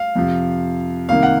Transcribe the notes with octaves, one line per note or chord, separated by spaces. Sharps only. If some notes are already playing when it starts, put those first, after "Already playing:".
Already playing: F5
F2 C3 F3
C2 C3 D#3 A#3 F5
F#5